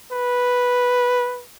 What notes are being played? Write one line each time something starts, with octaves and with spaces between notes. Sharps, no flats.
B4